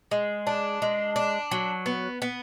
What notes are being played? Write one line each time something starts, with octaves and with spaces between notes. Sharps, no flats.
G#3
D4
G#3
D4
F#3
B3
B3